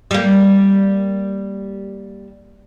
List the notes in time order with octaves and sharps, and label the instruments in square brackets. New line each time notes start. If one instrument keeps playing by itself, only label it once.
[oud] G3 A#3